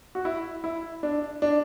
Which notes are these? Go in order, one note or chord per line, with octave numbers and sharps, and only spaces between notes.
F#4
E4
E4
D4
D4